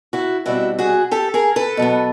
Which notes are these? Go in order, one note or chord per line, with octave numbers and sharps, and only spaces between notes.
E4 F#4
B2 G3 C4 E4 F#4
F#4 G#4
G4 A4
G#4 A#4
A4 B4
B2 F#3 B3